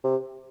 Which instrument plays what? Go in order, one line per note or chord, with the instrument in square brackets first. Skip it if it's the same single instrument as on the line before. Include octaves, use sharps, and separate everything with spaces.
[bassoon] C3